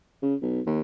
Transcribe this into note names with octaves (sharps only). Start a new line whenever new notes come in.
C#3
B1
D#2